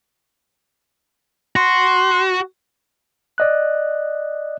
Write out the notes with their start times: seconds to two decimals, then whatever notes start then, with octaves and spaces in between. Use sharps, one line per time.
1.56 F#4 C6
3.38 D5 D#5 F#6